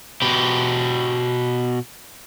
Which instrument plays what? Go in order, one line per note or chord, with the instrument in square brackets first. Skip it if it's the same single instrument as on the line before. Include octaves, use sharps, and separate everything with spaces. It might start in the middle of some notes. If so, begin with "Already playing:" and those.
[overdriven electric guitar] B2 G4